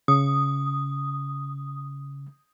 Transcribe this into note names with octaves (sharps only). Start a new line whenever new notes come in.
C#3 D#6